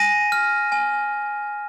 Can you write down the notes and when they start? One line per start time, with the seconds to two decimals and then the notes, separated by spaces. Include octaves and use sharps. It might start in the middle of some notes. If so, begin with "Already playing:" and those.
Already playing: G#5 A#6 D#7
0.32 F6
0.72 G#5